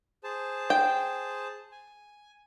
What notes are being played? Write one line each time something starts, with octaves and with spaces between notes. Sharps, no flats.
G#4 C5 A5
G5
G#5